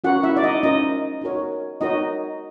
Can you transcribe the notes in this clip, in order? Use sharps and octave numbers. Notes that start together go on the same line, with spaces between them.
C#4 F4 F#4 A#4 F#5
E4 E5
D5
D#4 D#5
C#4 D#4 F4 A#4 D#5
D#4 F#4 A#4 C#5
D#4 F#4 A#4 C#5 D#5